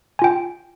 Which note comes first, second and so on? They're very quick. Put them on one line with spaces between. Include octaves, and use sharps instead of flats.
G#5 F4 G5